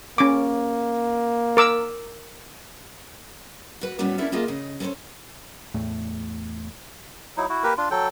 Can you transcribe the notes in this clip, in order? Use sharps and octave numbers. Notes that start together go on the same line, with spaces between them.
A#3 C#4 D6
A#4 D6 E6
F#4 B4
A2 G3 B3 C#4 F#4
A#3 B3 C#4 D4 E4 A4
A#3 B3 F4 G#4 D#5 E5
C#3 D#5
C#4 A4 A#4 C5 C#5
E2 A2 A3
F#3 D#4 E4
E4 F#4
A#3 G4 A#4 B4
D4 F4
F#3 A4 G5